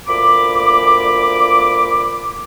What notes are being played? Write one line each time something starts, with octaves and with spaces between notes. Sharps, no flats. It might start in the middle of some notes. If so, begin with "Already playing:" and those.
D2 A#2 B5 D6